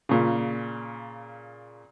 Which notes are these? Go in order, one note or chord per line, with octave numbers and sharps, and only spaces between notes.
A#2 C#3